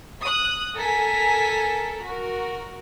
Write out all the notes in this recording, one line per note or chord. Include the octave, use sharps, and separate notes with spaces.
D#6 F#6
A4 A#4 G#5 A#5 B6
F#4 A#4